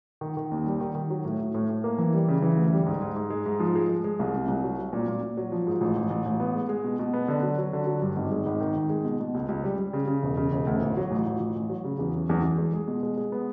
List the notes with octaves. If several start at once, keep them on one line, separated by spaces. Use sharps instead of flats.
D#3
D#3
D#2
G3
D#3
D#3
F#3
A2
A2
A2
A2
A#3
E3
G3
C#3
E3
D2
G3
G#2
G#2
G#2
G#3
G#2
F3
G#3
G#3
G#3
C2
C3
C2
F#3
F#3
A#2
A#2
A#2
F#3
F3
G#2
A1
A1
A1
A1
B3
G#3
G#3
B2
B2
B3
D3
F#3
F#3
D3
F#3
G2
G#1
G#3
G#1
D#3
G#1
G#3
B2
B2
C#2
C#2
G3
G3
C#3
C#3
E1
C#3
E1
D2
A1
F#3
A1
A1
A1
A1
F#3
C#3
E2
F#3
E2
E2
G#3
G#3
B2
G#3
G#3
B3